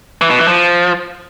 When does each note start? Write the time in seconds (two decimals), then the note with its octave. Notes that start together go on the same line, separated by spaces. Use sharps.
0.21 E3
0.30 B2
0.39 E3
0.48 F3